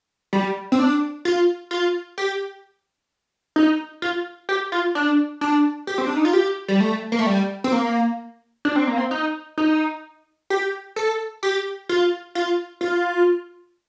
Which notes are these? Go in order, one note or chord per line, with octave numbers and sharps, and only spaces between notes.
G3
C4
D4
F4
F4
G4
D#4
F4
G4
F4
D4
D4
G4
C4
D4
D#4
F4
G4
G3
A3
A#3
A3
G3
C4
A#3
D4
C4
A#3
C4
D#4
D#4
G4
A4
G4
F4
F4
F4